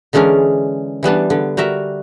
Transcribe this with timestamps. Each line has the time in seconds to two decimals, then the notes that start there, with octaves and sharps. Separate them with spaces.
0.13 D3 E3 G#3 C#4 D4 A#4
1.03 E3 G3 B3 D4
1.30 D3 B3
1.57 G3 F#4 A#4 E5